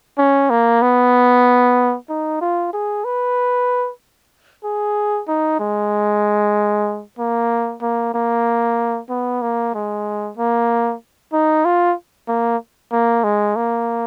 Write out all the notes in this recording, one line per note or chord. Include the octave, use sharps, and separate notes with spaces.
C#4
A#3
B3
D#4
F4
G#4
B4
G#4
D#4
G#3
A#3
A#3
A#3
B3
A#3
G#3
A#3
D#4
F4
A#3
A#3
G#3
A#3